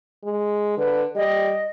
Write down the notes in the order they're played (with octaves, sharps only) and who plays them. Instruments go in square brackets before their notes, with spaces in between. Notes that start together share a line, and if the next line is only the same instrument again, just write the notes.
[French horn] G#3
[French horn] D3 [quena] B4
[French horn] G3 [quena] D#5